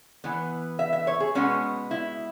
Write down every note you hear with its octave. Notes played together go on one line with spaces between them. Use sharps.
E3 B3
E5
E5
C#5
G#4
B2 G#3 B3 C#4
E4